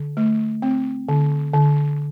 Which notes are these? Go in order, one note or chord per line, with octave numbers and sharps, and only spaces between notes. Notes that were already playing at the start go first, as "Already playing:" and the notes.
Already playing: D3
A3
C4
D3
D3